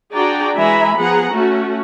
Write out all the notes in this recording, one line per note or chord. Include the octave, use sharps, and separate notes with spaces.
D4 F#4 G#4 D5 G5 A#5
E3 G#3 E5 G#5 A#5 B5
F3 B3 G#4 F#5 A#5
A3 C#4 F#4